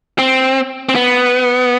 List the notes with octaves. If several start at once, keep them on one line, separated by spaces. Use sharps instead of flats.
C4
C4
B3